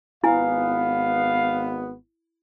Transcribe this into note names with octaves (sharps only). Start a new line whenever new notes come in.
G#1 B3 E4 F5 G#5